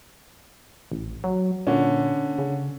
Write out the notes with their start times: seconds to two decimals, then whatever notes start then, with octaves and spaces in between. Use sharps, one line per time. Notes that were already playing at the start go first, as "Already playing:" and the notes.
0.92 A1
1.24 F#3
1.67 A#2 D3 C#4
2.39 C#3